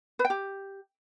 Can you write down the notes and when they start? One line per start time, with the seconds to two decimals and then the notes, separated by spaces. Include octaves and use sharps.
0.19 B4
0.25 G5
0.30 G4